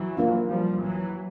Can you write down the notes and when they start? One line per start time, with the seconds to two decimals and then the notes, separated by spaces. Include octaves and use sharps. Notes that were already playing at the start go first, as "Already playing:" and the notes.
Already playing: E3 F#3
0.17 A#3 D4 F4
0.49 F3 G3
0.82 E3 F#3